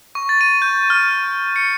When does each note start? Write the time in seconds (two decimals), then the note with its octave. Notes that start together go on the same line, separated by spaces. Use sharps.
0.15 C#6
0.29 A6
0.41 D#7
0.62 G6
0.90 F6
1.56 C#7